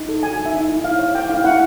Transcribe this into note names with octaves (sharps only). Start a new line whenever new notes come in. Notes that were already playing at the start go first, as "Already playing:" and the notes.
Already playing: D#4
A4
F#4 G#5
D#4
E5
D#4
E4
E4 F5
C#5
A4 G5
E4 F5
E4 F#5